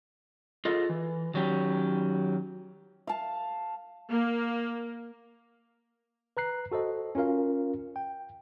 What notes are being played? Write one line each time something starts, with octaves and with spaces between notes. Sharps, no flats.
F4 G#4 A4 D#5
E3
D#3 F#3 C#4 G4
F5 A5
A#3
B4 A#5 F#6 C7
F#4 A4 C5 D#5
C#4 F4 A#4 F5
G5